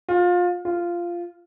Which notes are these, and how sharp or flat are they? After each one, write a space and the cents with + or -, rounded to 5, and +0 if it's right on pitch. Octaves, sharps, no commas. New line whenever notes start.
F4 +25
F4 -10